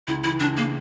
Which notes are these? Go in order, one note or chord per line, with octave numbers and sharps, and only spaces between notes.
C#2 E4
E3 E4
C#2 D4
C#3 A#3